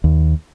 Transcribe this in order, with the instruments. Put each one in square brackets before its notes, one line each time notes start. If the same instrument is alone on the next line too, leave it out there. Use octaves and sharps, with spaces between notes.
[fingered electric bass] D#2